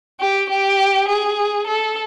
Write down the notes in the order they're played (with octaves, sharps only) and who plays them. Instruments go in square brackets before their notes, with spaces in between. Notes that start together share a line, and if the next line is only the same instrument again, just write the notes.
[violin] G4
G4
G#4
A4